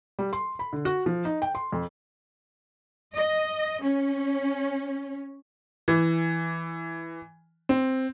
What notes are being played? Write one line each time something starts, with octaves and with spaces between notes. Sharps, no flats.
G3
C6
B5
D3
F#4
F3
D#4
G5
C6
F2
D#5
C#4
E3
C4